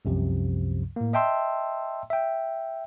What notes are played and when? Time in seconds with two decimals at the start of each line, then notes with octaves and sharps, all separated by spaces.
0.05 C2 F#2 C3 F3
0.96 A2 A#3
1.13 D#5 E5 G5 A5 C6 E6
2.10 E5 G5